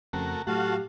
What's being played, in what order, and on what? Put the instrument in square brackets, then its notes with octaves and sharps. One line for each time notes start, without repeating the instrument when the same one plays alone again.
[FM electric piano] F2 C#3 C4 [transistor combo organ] A3 F#4 A#4
[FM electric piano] A2 F#3 [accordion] F#4 F5 [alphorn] G4 [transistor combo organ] A4 F#5